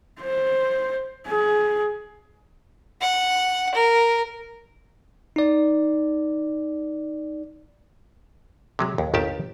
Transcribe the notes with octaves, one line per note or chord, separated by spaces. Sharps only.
C5
G#4
F#5
A#4
D#4 D5
C3 F#3 G#3
D#2
G1 D#2 D#3 G4 A5